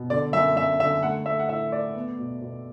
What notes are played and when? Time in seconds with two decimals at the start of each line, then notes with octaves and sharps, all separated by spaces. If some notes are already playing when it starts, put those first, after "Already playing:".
Already playing: B2
0.10 D3 D5
0.33 F#2 E5
0.56 F#2 E5
0.80 D3 E5
1.03 A3 F#5
1.26 A3 E5
1.39 F#5
1.49 A2 E5
1.72 A3 D5
1.95 B3
2.18 B2
2.41 B2